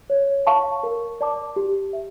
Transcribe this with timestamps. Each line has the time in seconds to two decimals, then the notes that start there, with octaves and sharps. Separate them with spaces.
0.10 C#5
0.47 F5 A5 C#6
0.83 A#4
1.21 D5 A5 D6
1.56 G4
1.93 E5